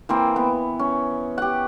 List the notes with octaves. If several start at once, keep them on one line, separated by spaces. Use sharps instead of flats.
E3 A#3 C4
B3
C#4
G4 F#5